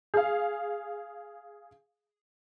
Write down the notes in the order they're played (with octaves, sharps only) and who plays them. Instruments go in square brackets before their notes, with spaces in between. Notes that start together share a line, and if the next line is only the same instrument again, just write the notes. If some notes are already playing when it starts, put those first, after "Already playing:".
[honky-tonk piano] G#4 F5